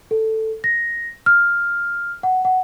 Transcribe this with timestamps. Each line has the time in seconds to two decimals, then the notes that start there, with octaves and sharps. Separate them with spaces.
0.11 A4
0.64 A#6
1.26 F6
2.23 F#5
2.45 F#5